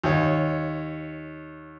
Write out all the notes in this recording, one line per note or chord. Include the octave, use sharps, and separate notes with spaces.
D#2 C#5